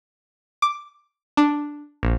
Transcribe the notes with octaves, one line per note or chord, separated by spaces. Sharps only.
D6
D4
A#1